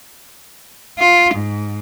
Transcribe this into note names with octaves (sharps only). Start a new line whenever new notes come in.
F4
G#2